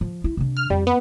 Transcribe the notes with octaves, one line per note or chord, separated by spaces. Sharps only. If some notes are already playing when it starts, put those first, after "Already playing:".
F3
E4
C3 D4
F6
F2 G3
B3